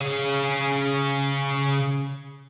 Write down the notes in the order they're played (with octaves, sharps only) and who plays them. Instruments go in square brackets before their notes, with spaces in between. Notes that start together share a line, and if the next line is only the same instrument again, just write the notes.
[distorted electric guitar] C#3 G#4